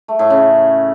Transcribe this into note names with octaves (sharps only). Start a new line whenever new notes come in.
A3
A2
C#3